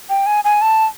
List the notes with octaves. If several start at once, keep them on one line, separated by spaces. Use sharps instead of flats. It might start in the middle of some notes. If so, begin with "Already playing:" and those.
G5
G#5
G#5
A5